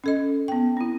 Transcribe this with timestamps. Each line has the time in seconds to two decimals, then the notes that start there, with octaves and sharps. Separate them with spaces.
0.04 C#4 A4 D#5
0.48 B3 G5
0.77 C4 E4